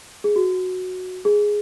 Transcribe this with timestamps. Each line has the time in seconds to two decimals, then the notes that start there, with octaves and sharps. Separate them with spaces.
0.24 G#4
0.36 F#4
1.25 G#4